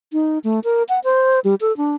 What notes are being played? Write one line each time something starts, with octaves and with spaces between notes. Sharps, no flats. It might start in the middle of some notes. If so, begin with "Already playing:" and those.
D#4
A3
A#4
F#5
C5
G3
A4
D4